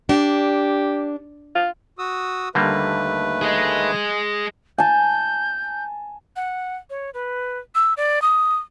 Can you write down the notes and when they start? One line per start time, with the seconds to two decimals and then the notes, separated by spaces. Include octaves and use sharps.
0.09 D4 G4
1.55 F4
1.98 F#4 D#6 E6
2.55 D#2 D3 G3 A3 A#3 B4
3.42 G#4 D#5
4.78 G#5 A5 G6
6.36 F#5
6.90 C#5
7.14 B4
7.75 E6
7.97 D5
8.22 D#6